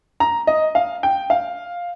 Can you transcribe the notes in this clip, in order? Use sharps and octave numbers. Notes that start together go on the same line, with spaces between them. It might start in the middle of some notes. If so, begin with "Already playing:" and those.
A#5
D#5
F5
G5
F5